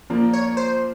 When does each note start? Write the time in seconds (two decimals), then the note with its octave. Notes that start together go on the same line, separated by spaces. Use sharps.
0.10 A#2 F3 A#3
0.33 C#5
0.57 C5